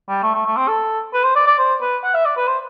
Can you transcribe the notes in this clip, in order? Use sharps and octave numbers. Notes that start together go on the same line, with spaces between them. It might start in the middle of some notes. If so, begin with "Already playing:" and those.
G3
A3
A3
A3
C4
A4
B4
C5
D5
D5
C5
B4
F#5
E5
D5
B4
C5